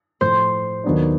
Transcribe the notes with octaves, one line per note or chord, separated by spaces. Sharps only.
A2 F3 A3 C5
D#2 D#3 F#3 B3 D4